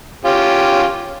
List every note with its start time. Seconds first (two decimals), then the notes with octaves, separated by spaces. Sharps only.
0.25 C#4 F4 G4